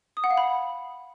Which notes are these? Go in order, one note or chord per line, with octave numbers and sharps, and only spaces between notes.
D#6
F#5
F5
B5